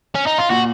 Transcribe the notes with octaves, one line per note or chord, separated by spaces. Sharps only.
C#4
D#4
F4
A#2 F#4